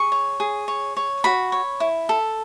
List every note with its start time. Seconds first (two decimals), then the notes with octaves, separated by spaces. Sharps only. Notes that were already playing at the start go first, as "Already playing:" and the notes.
Already playing: G#4 C#6
0.12 C#5
0.40 G#4
0.68 C#5
0.97 C#5
1.24 F#4 B5
1.52 C#5
1.80 E4
2.09 A4